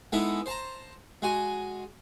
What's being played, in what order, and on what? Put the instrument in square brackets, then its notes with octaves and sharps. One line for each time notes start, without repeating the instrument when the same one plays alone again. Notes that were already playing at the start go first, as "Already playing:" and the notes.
[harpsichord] G#3 B3 D#4 E4 A4
C5 A5 A#5
G#3 F#4 G#5